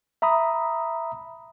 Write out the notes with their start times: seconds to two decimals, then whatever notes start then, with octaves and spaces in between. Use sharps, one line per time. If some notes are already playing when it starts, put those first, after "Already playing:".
0.22 E5 A#5 B5 D#6